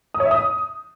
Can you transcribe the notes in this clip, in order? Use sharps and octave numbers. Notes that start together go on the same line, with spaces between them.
D#6
C#5
E5
D#6